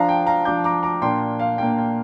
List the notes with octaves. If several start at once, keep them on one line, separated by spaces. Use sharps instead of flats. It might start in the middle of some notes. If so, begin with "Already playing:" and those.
Already playing: F3 D4 F5 A#5
G5
F5 A#5
F3 D4 D6 G6
A#5 D6
A#5 D6
A#2 A#3 D4 G5 C6
F5
A#2 A#3 D4 G5
G5